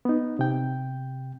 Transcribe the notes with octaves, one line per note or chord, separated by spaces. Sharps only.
B3 D#4
C3 G5